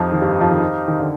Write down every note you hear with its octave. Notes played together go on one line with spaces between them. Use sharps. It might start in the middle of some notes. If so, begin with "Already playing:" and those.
Already playing: F2 F3 D#4 G4 C5 F5
D#3
G2 G3
F2 F3
D#3
D#3
D3